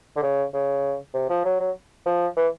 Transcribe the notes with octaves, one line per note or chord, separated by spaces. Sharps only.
D3
C#3
C#3
C3
F3
F#3
F#3
F3
E3